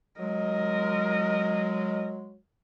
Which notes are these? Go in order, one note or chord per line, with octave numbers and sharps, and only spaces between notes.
F#3 G#3 A#4 D#5